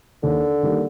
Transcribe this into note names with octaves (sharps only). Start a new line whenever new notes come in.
D#2 D3
D#3 G3 A#3